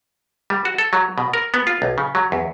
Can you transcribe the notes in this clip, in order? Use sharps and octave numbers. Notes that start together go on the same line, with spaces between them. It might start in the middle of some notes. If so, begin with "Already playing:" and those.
G3
F#4
A4
F#3
B2
A#4
B3
F4
B1
C#3
F#3
E2